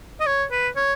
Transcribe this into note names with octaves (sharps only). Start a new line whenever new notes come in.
D#5
C#5
B4
C#5